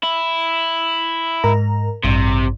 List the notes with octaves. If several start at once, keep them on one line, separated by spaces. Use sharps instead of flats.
E4
G#2 A#4 A#5
A1 G2 C3